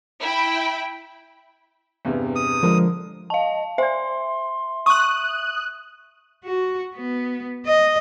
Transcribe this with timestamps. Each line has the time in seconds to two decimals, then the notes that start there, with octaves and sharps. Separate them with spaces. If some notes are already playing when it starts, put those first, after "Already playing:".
0.21 E4 G5 B5
2.05 E2 G2 C3
2.35 D#6
2.63 D3 F3 G#3 A#4
3.30 D#5 F5 A5
3.78 C5 D5 E5 C6
4.86 C#6 D#6 F#6
6.44 F#4
6.95 B3
7.66 D#5